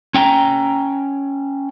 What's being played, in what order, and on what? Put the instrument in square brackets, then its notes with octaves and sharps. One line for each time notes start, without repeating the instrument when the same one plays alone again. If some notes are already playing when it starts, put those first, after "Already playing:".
[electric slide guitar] C#4 G5 G#5 A#5